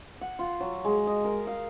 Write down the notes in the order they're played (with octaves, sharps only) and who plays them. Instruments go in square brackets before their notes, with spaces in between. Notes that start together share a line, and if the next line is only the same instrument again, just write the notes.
[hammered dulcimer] F#5
F4
F#3
G#3
D#5
A#4
F5